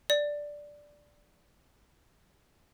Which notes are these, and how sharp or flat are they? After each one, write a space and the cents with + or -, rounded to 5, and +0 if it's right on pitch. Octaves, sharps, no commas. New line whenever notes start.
D5 +0